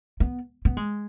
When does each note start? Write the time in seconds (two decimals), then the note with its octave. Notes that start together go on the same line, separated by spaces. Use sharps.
0.20 B3
0.65 B3
0.77 G#3